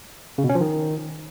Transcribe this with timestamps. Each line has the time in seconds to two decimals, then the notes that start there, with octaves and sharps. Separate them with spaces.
0.38 C#3
0.44 B2
0.49 C#4
0.55 F3
0.61 D#3